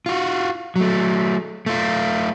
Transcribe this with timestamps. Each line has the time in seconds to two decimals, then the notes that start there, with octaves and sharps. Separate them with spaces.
0.06 F4 F#4
0.76 F#3 A3
1.66 A3 F4